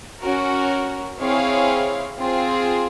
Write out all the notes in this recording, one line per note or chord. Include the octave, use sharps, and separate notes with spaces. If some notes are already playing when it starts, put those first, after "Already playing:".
C#4 F#4 A#4
C4 E4 G#4 C#5 F5
C4 F4 G#4